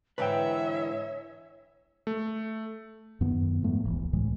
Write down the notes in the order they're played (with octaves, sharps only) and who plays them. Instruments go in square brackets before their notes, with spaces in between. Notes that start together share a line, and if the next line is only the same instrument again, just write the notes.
[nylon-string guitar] G#2 D3 E3 [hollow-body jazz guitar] B4 G5 [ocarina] C#5 [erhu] E5
[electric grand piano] A3
[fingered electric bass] F#2 D#3 B3
G#2 F3 A3 B3
D1 A#1 E2 E3
C#2 A2 E3 G#3